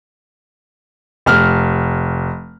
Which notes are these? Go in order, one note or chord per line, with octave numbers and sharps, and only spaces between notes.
F1 F6